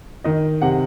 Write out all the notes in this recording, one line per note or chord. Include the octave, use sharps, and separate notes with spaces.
D#3 D#5
C3 F#5